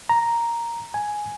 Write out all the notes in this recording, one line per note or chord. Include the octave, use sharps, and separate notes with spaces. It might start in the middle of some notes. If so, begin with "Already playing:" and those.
A#5
G#5